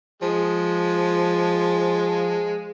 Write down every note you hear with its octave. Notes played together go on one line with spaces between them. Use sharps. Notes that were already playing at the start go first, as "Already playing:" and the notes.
F3 G#3